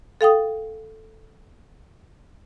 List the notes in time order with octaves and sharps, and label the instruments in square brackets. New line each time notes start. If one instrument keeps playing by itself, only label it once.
[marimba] A4 F5 G5 D#6